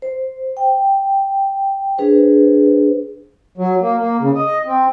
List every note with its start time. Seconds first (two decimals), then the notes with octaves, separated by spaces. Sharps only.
0.02 C5
0.57 G5
1.98 D4 G#4 B4 C5
3.57 F#3
3.81 A#3
3.98 A#3
4.20 C#3
4.35 D#5
4.66 C4